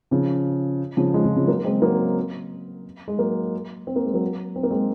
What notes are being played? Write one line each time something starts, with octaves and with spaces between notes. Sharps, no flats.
C#3 F3
C#3 F3
F3 G#3
C#3 F3
C#3 F3
F#3 A#3
G#3 C4
F#3 A#3
G#3
F#3 A#3
C4
A#3
G#3
F#3 A#3
C4
A#3
G#3 C4